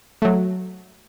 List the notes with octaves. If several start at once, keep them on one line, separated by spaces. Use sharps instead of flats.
F#3 A3